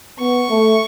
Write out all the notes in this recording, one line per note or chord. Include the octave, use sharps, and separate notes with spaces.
B3 C#6
A3